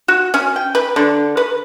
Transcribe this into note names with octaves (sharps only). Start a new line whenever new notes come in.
F#4
C#4
G5
B4
D3
B4